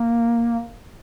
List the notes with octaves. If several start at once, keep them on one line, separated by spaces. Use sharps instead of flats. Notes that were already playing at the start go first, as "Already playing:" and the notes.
Already playing: A#3